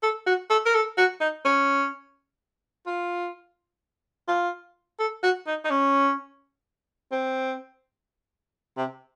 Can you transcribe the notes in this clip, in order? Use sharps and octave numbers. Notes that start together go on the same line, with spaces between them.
A4
F#4
A4
A#4
A4
F#4
D#4
C#4
F4
F4
A4
F#4
D#4
D#4
C#4
C4
C3